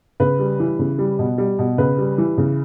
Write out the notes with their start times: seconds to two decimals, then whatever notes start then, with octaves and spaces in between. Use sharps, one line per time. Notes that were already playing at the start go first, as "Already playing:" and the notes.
0.20 C#3 B4
0.39 G3
0.60 E3
0.79 C#3
0.99 G3
1.19 B2
1.38 G3
1.59 B2
1.78 C#3 B4
1.98 G3
2.18 E3
2.38 C#3